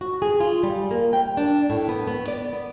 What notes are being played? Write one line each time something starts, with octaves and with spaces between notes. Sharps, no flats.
F#4
G#4
F4
G3
A#3
G5
D4
A2
B3
B3
D5
B3